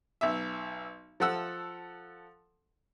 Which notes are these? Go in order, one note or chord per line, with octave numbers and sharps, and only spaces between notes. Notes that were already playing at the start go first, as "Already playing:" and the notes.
B1 E5
F3 A4 F#5 E6